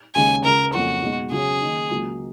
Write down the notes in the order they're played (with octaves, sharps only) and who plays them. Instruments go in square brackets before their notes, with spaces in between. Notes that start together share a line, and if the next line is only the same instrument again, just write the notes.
[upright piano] D#2 C#3 G#3 C#4 [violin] G#5
[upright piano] C#2 C#3 G#3 [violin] A#4
[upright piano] F2 C#3 F#3 A#3 C#4 [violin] F#4
[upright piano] B2 G#3 B3 D#4
[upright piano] C#3 F#3 C#4 [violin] G#4
[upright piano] D#3 A#3 D#4
C#2 C#3 F#3 A#3